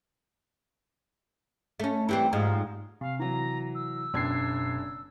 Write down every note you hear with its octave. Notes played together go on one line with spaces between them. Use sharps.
A3 C#4
E3 G3 C4
G#2 F3
C3 F5
E3 F#3 A#5
E6
F#1 B2 D4 G#6 C7